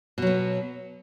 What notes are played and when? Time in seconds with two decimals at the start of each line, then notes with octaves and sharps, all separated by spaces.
0.18 B2
0.22 F#3
0.27 B3